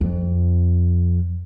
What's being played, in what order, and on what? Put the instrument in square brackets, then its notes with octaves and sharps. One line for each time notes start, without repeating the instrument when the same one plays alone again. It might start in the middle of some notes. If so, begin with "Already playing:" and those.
[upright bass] F2